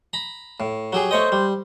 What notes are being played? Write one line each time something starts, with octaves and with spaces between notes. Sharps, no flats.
A#5 B5
A2
F#3 G4 G#4
A3 C5 C#5 D#5
G3